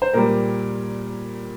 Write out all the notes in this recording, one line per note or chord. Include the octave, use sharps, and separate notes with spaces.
C5
A#2 G3 A#4